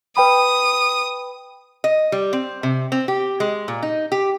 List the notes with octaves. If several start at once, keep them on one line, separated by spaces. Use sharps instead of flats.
B4 G5 B5 D#6
D#5
G3
C4
C3
C4
G4
G#3
A#2
D#4
G4